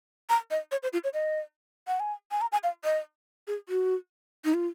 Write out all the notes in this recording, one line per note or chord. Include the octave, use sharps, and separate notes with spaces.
A#5
D#5
C#5
C5
F4
C#5
D#5
F#5
G#5
G#5
A#5
G#5
F5
D#5
G#4
F#4
D#4
F4